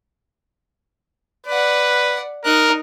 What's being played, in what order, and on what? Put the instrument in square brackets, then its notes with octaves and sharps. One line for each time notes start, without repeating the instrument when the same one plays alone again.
[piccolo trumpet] B4 [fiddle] D5 F#5
[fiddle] D#4 F#6 [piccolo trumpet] A#4